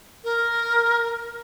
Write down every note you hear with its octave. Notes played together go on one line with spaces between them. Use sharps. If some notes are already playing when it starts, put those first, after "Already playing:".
A#4